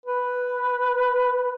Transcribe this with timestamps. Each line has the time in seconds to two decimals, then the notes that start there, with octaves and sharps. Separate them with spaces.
0.06 B4